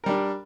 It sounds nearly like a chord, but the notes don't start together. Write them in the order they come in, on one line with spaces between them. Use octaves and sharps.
A#4 G3 D4